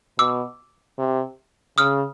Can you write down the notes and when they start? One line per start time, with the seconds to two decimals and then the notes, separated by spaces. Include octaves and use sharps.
0.19 B2 D6 E6
0.98 C3
1.78 C#3 D#6 F6